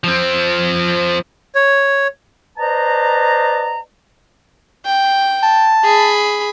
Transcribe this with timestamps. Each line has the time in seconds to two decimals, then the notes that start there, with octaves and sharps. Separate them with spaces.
0.04 F3 C4
1.55 C#5
2.58 B4 C5 D5 D#5 A5 A#5
4.86 G5
5.43 A5
5.84 G#4 B5